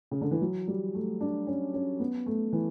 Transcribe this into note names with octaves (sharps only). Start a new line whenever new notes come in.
C#3
D3
E3
F#3
G3
A3
D4
C#4
C#4
B3
A3
E3